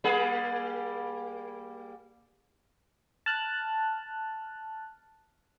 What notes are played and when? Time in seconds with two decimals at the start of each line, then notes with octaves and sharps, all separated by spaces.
0.04 G3 A#3 G#4
3.26 A5 F6 F#6